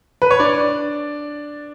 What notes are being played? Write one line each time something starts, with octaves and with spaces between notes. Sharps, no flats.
B4
C#5
D4 D5